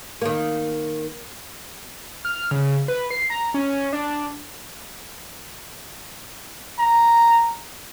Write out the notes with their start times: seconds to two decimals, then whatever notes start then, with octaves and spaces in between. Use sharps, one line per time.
0.21 D#3 A#3
2.25 F6
2.51 C#3
2.88 B4
3.10 C7
3.30 A#5
3.54 C#4
3.93 D4
6.79 A#5